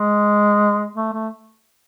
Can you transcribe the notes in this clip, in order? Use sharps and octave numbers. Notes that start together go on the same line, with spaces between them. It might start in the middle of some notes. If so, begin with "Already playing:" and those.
Already playing: G#3
A3
A3